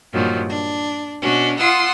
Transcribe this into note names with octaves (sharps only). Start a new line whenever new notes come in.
G2 A#2 D#3 F3 F#3
D4
B2 C#4 D4 F#4
F4 F#5 C6 D#6 E6